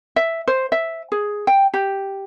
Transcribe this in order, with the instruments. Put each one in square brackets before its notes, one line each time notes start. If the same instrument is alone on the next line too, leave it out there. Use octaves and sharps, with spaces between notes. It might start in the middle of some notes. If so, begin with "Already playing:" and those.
[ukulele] E5
C5
E5
G#4
G5
G4